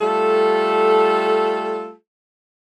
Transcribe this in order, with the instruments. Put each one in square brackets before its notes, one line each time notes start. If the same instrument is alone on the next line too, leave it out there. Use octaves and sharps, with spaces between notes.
[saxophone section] G3 A3 F4 A4